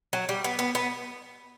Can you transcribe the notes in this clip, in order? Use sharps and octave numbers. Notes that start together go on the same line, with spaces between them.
F#3
G3
B3
B3
B3